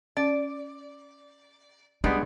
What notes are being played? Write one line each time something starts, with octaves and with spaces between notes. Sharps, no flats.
C#4 D5
G3 G#3 B3 D4